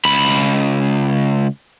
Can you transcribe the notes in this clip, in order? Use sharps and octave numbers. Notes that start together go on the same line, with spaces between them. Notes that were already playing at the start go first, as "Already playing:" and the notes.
C#2 B5